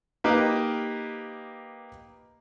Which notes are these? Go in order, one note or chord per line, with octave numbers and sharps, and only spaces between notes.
A#3 D#4 G4 B4 D#5